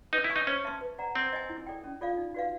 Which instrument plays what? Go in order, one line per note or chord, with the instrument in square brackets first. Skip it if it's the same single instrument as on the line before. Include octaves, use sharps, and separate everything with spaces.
[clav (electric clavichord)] D#4 [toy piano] B4
[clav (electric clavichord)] E4
[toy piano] E5 G#5 C#6
[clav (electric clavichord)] D#4
[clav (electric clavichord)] C#4 [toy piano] C5
[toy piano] E5 A5 C6
B4
D5 F#5 A#5
[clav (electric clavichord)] C4 [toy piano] C5
[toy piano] D#5 G#5
E4
A4 D5 G5
C#4
F4 A4 D5 F5
D#4
F#4 B4 D5 F5